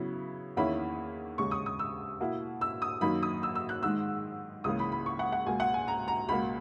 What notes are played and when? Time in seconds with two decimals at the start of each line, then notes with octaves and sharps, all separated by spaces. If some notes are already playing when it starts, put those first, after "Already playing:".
Already playing: C#3 F#3 B3 E4
0.57 E2 D#3 A#3 C#4 E4 B5
1.38 D#2 C#3 G#3 C#6
1.51 D#6
1.66 D#6
1.79 E6
2.21 B2 A#3 E4
2.61 E6
2.82 D#6
3.01 F#2 D#3 A#3 D#4 B5
3.23 D#6
3.43 E6
3.55 E6
3.69 F#6
3.83 G#2 D#3 G#3 E6
4.64 C#2 C#3 E3 A#3 D#6
4.79 B5
4.92 B5
5.06 C#6
5.19 F#5
5.32 F#5
5.46 C#2 B2 A#3 G#5
5.60 F#5
5.74 G#5
5.88 A#5
6.08 A#5
6.28 C#2 B2 A#3 B5